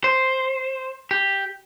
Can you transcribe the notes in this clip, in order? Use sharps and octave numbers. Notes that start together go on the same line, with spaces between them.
C5
G4